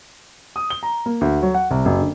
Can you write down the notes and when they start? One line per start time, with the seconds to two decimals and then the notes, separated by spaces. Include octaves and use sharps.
0.56 D#6
0.70 G7
0.83 A#5
1.06 A#3
1.21 D2
1.42 F#3
1.55 F#5
1.71 C2
1.85 F#1
2.01 D3